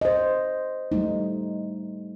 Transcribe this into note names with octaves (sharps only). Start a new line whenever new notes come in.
C5 D#5
G3 A3 D#4